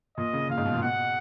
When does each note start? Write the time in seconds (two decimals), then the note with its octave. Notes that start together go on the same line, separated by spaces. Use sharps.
0.17 A#2 D#5
0.33 C#3
0.49 A#2 F5
0.58 G#2
0.66 B2
0.74 A#2
0.82 B2 F#5